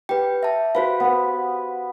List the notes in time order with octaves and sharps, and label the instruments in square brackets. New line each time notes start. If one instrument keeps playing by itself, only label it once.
[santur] G4 [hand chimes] B4 G5
[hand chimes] E5 A5
[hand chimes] F#4 C5 F5 [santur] B4
[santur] B3 B4